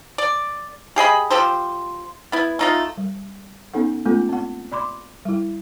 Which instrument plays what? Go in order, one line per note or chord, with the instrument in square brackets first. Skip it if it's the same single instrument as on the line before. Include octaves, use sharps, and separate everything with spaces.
[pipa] D5
G4 G#4 D#5 B5
F3 G4 A4 C5
B3 E4
A3 D#4 F4
[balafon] G3
B3 C#4 D#4 A4 F#5
G#3 A3 B3 C#4 F4 A4
C4 F#5
D5 B5 C6 D6
G3 E4